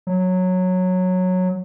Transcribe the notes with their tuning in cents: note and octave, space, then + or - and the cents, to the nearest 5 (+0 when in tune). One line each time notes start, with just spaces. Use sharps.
F#3 -10